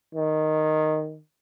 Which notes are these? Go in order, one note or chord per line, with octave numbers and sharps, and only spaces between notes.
D#3